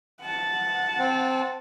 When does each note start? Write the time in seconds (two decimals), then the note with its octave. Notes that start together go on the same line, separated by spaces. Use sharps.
0.21 F#5 A5
0.99 C4